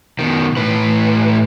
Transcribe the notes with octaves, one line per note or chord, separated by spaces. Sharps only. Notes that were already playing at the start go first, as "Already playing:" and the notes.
B2 D#3
A2 B4